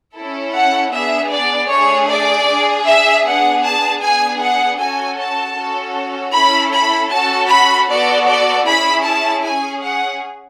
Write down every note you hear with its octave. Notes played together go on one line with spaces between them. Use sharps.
C#4 E4 A4
F#5
B3 D4 G#4 E5
D5
A3 D4 G#4 C#5
D5
D4 G#4
E5
B3 D4 G#4 F#5
A5
B3 D4 G#4 G#5
F#5
C#4 F#4 A4 G#5
A5
C#4 F#4 A4
C#4 E4 A4 B5
B5
C#4 F#4 A4 A5
B5
B3 F#4 A4 D5
D5
C#4 E4 G#4 B5
A5
C#4 G#4 G#5
F#5